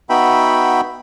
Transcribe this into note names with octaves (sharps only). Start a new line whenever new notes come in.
B3 D#4 F#4 E5 G5 B5